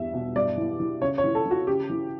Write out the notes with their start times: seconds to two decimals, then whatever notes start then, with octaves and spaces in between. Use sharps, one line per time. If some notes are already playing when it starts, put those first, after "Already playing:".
Already playing: E2 G2 E5
0.14 B2
0.36 G2 D5
0.58 E3
0.80 E3
1.01 C#3 C#5
1.18 C#5
1.24 E3
1.35 A4
1.46 E3
1.51 F#4
1.67 C#3 G4
1.90 E3